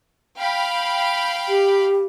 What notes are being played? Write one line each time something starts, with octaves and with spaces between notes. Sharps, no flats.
F5 G5 B5
G4